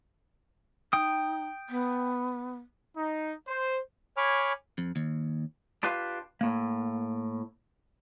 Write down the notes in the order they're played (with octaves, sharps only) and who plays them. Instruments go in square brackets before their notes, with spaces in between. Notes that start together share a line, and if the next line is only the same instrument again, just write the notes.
[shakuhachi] D#4 [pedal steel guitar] G5 D#6
[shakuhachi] B3
[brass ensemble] D#4
C5
[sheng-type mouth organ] C#5 G#5 B5 D6 F6
[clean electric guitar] F2
D#2
[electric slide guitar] D4 F4 G4 B4 F5
A2 A#3